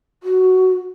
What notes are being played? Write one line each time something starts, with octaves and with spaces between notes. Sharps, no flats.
F#4